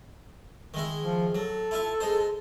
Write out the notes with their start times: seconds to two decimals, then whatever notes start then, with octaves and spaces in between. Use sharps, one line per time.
0.74 D#3 G#3 E4
1.01 F3
1.35 F#3 A4
1.71 E4 F4 E5
2.00 G#3 D#4 C5